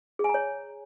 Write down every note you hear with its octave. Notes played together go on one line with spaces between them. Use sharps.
G#4
G#5
A#5
C#5